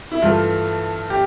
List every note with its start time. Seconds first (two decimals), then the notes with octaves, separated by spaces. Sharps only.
0.12 E4
0.22 G2 E3 A3 F4
1.10 G4